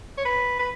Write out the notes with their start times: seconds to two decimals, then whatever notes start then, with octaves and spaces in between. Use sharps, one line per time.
0.18 C#5
0.25 B4
0.59 B4